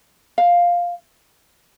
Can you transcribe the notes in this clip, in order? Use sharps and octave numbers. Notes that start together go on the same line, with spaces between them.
F5